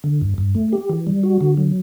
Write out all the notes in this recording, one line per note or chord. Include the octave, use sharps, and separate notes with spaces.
D3
G2
G2
A3
G4
E3
G3
F#4
D3
F#3